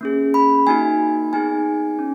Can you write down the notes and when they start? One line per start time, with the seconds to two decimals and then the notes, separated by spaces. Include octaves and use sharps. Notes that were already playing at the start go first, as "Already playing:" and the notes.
0.01 A#3 C#4 G#4
0.34 B5
0.67 A#3 D#4 F#4 G#5
1.33 B3 D#4 G#4 G#5
1.99 C#4